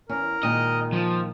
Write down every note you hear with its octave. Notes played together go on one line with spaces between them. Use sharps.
E2 C#4 A#4
A#2 D#3 G#3 D#5
F3